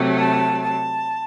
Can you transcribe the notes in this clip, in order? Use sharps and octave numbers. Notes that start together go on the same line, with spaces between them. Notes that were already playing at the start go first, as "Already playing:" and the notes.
Already playing: C3 F#3 A3
A5
A5